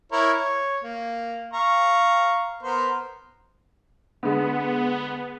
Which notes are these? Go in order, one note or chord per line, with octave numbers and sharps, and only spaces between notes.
E4 A#4 C#5
C#5
A#3
F5 A#5 C#6
B3 A#4 C5
D3 G#3 B3